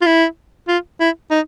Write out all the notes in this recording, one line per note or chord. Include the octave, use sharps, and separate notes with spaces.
F4
E4
F4
E4
D#4